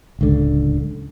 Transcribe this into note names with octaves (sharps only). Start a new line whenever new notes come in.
D1 C#2 D3